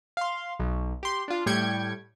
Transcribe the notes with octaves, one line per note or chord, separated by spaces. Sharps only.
F5 C6
B1
G4 C6
D4 F4
A2 G3 G5 G#6 C#7